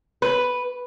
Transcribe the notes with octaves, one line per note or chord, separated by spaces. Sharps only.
B4